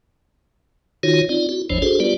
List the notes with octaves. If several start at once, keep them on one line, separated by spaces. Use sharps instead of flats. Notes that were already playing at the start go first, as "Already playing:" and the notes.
D#3 D#4 F4 F#4 C#5
C4 D#4 F4 D5
E4 F#4
G#1 E2 F3 D4 C5 C#5
D4 F#4 G#4 A4 C5
G3 B3 F4 G4 B4 D5